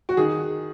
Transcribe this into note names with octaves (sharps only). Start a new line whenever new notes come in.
F#4
D#3 G#4